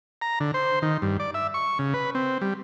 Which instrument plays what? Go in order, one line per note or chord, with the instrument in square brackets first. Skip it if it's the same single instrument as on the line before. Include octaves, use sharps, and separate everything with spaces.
[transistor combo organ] A#5
D3
C5
D#3
G2
D5
E5
C#6
C#3
B4
C4
G3